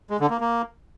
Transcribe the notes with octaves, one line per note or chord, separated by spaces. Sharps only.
G#3
D3
A#3
A#3